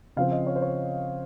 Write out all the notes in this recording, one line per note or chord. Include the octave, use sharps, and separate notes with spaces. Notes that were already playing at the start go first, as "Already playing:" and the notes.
C#3 F3 C4 F5
D#5
C#5
C5
C#5